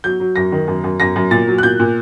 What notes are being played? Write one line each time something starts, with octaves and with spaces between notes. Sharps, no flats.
F#3 G6
F#3
F#2 A#6
D#3
F#2
F#2
F#2 A#6
F#2
A#2 A6
F#3
F#6
A#2 G6
A#2